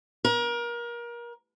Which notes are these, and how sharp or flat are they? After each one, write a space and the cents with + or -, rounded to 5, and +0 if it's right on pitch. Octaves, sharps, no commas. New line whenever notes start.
A#4 +30